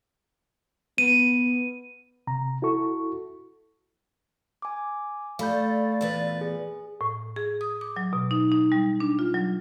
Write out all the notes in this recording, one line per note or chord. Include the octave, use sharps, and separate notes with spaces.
B3 D#7
C3 A#5
E4 F#4 A4 C#6
G#5 D6
A3 A4 D5 F5 B5 G6
E2 A#2 B4
G#4
A2
G#4
D#6
D6
F#3
B2
D#4
D#4
G3
D4
F4
F#3